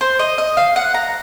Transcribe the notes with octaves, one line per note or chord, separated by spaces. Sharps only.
C5
D#5
D#5
F5
F#5
A#5